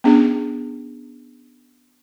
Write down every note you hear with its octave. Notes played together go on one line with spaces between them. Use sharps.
B3 C#4 D4 G#4